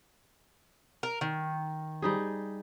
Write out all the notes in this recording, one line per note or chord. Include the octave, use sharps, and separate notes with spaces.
A#4
D#3
G3 D#4 G#4